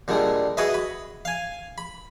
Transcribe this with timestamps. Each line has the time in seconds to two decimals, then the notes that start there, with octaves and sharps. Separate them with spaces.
0.08 A#2 D3 G3 G#3
0.57 F#4 G#4 B4 D#5 E5
0.74 B5
1.25 F5 G#5
1.78 B5